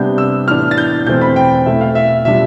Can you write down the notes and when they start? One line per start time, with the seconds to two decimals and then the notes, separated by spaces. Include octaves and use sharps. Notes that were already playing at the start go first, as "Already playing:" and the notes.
Already playing: C3 G3 B3 D4 G6
0.18 E6
0.48 A2 E3 B3 D4 F6
0.71 A6
0.78 G6
1.07 E2 B2 A3 C4 G6
1.21 B5
1.36 G5
1.66 B2 A3 E4 E5
1.81 F5
1.95 E5
2.25 B2 G3 D4 F4 E5